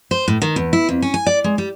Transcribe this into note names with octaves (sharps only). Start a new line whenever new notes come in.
C5
A2
D#3
E2
E4
F2
C#4
G#5
D5
G#3
G3